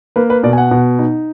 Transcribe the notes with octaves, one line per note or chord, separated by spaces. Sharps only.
A#3 B4
B4
B2 D5
G#5
F#5
B2
D#4